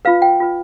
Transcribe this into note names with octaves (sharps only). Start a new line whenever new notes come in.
F4 B4 F5
G5
F4 B4